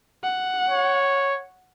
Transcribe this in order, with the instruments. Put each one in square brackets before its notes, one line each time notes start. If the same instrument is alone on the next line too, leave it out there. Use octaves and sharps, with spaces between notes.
[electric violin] F#5
[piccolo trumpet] C#5